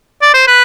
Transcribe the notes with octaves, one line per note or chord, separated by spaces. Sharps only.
D5
C5
B4